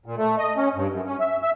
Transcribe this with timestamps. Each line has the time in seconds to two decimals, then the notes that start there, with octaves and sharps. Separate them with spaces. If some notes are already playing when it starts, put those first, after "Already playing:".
0.06 A#2
0.18 A3
0.38 D#5
0.57 C#4
0.75 G2
0.92 F#2
1.06 C#4
1.19 E5
1.42 E5